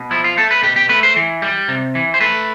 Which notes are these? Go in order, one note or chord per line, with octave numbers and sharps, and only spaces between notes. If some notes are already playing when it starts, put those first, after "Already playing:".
Already playing: B2
F3 E4
F4
A3 A4
B4
B2 G4
G4
A3 B4
C5
E3
G3
C3
E3
C5
A3 B4